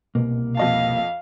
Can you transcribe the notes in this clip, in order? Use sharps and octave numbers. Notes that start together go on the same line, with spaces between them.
C2 B2 A#3
F2 D#5 F5 A5